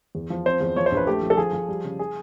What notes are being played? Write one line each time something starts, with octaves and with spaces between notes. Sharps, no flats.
E2
F3
C4 C5
E2
F3 C#5
C5
A#1
B4
A3 G4
F3
A4
F3 G#4
F3
G3
C#3
G#4